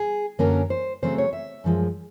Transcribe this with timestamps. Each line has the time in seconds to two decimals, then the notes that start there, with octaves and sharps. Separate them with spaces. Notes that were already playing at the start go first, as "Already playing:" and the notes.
Already playing: G#4
0.39 F#2 D3 F#3 A#3 C#4 A#4
0.70 C5
1.02 C#3 F#3 A3 C4 C5
1.18 C#5
1.33 E5
1.64 F#2 D3 F3 G#3